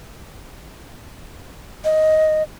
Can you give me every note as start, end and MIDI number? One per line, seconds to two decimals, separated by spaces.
1.85 2.43 75